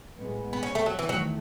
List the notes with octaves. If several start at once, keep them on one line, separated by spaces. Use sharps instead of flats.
A2 G#3 B3
B3
C#4
A3
F#3
E3
E2 D#3 F#3 A3